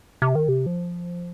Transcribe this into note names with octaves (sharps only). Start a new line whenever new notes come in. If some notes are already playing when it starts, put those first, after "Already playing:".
C3
D#3
C3
F3